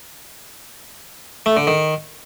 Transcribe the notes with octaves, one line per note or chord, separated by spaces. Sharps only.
A3
D3
D#3